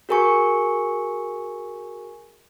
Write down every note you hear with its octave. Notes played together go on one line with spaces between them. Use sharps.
F#4 G#4 A#4 G#5 C#6 C#7